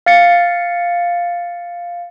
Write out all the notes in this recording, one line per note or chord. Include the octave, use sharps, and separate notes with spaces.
F5 A6 C#7